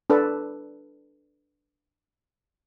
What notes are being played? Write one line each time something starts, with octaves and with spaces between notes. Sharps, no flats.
D4 A4 B4